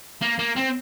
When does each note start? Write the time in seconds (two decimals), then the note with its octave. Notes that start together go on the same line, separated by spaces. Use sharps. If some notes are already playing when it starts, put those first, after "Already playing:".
0.22 A#3
0.39 A#3
0.56 C4